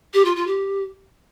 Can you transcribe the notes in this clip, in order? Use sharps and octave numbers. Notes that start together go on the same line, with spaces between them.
G4
F4
F4
G4